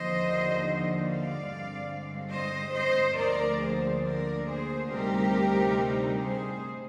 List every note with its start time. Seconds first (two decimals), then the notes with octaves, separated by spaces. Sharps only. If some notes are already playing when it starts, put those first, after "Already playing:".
Already playing: D#2 D3 F3 C5 D#5
1.00 D5 F5
1.44 G2 D3 G#3 C4
2.30 C5 D#5
2.74 C5 D#5
3.17 D2 D3 F3 A#3 A#4 D5
3.61 G#4 C5
4.04 A#4 D5
4.48 G#4 C5
4.91 D2 C3 G3 C4 D#4 G4 A#4
6.21 G#4 C5